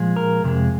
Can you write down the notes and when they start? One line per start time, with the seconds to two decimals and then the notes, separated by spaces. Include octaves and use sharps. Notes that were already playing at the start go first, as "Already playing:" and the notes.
Already playing: A#2 F3 G#3
0.16 A#4
0.44 F2 C3 G#3